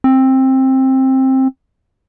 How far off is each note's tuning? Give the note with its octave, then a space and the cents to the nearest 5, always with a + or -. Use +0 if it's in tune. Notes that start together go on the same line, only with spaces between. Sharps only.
C4 +15